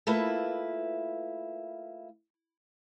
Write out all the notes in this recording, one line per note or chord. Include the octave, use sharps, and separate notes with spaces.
A3 A#3 E4 F4 B4